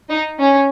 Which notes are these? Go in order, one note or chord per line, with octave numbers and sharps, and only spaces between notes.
D#4
C#4